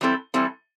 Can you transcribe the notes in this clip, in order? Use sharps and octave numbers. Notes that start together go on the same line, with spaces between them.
E3 G3 C4 E4 A4
E3 G3 C4 E4 A4